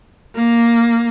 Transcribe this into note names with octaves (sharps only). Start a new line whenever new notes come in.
A#3